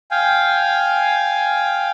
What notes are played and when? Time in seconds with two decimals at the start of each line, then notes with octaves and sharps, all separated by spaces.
0.11 F5 G5 G#5